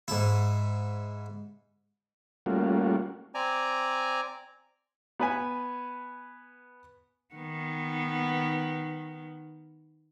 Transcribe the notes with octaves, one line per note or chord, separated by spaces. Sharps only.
G#2 E4
G3 A3 A#3 C#4 F4 F#4
C4 D5 G#5 A#5
B3 B4 G#5
D#3 B3